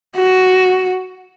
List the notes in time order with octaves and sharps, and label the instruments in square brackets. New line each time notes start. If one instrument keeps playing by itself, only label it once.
[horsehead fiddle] F#4